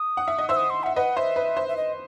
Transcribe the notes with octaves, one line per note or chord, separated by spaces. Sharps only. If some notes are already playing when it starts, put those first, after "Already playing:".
Already playing: D#6
F#5
E5
D#5
C5 E5 E6
D#6
C6
E5 F#5
B4 D#5 F#5
C5 E5
B4
C5
E5
D#5